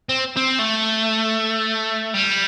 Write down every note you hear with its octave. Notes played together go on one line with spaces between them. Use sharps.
C4
C4
A3
G3